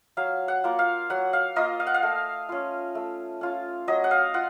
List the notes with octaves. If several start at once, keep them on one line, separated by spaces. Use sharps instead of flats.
F#3 F5
F#5
A#3 F4
F5
F#3 F#5
F5
A#3 F4 D#5
F5
F#5
F5
A3
C#4 F4
A3
C#4 F4
F#3 D#5
F#5
F5
F4 F#5